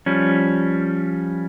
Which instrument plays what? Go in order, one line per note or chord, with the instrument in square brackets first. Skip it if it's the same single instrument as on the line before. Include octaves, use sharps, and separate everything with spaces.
[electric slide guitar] F3 G3 C#4